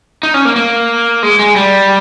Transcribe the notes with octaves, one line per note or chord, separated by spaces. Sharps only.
D#4
C#4
A#3
A#3
G#3
G#3
G3